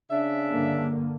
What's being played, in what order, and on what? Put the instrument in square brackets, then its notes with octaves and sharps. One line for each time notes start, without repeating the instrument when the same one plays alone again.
[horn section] C#3 D4 E5
[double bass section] G2 D3 A#3